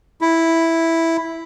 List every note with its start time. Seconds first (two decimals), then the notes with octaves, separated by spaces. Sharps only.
0.21 E4